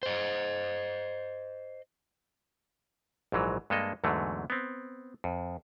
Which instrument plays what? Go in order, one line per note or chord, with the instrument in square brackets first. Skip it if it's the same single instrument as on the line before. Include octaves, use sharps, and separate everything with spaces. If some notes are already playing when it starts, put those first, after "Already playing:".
[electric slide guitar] C5 D#5
[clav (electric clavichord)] A#1 G#2 E3 F#3
G2 G#3 A#3 A4 D#5
E2 G#2 D3 F#3 A3
B3 C4
F2